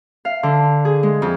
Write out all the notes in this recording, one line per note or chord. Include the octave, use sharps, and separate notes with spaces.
F5
D3
G#4
G#3
F2